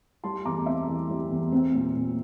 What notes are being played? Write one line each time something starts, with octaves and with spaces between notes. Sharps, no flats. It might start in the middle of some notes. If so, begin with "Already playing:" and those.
G3 A5 C6
E2 A#5 D6
C4 E5
E3
G3
E2
C4
A#2
A#2